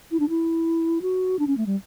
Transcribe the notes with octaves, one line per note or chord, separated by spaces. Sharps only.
E4
D4
E4
F#4
D4
C#4
A3
G3